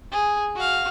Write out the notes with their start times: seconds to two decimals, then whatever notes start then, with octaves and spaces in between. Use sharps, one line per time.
0.11 G#4
0.56 F#4 F5